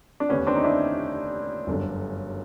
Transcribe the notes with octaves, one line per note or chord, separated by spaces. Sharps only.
D4
F1 D#2 D3 B3 C#4
C4 D4
D#4
D4 E4
G1 F#2 D3